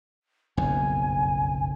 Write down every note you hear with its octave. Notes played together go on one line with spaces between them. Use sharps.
F#1 B1 F2 G#5